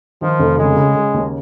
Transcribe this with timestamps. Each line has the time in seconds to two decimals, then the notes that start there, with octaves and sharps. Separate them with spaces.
0.21 D#3 F3
0.39 F1
0.58 C#3 G#3
0.76 C#3
0.96 C#3
1.14 D#2